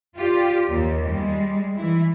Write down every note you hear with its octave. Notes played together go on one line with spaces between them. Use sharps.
F4 G4 D5
D#2
G3 G#3
E3 E4